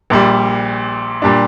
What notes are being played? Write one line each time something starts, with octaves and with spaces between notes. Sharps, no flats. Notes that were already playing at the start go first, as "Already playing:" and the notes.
A#1 A#2 G3
A#2 G3 D4